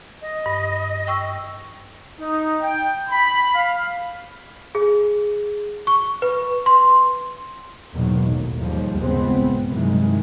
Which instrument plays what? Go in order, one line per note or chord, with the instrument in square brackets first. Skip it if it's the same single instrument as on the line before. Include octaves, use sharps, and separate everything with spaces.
[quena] D#5
[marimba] G2
G5 C#6 E6
[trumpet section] D#4
G5
B5
F5
[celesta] G#4
C#6
B4
C6
[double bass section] E2 G#2 B2 D#3 F#3 A#3
G#1 A2
D#2 G#2 F3 G3
G#1 C#2 G2 G#3 B3 C4
A#1
G2 C3 D#3 E3 F#3 G#3